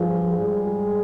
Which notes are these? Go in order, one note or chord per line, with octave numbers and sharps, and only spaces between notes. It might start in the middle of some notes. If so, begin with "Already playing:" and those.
Already playing: G2 F3 G#4
G#2 G3 G#4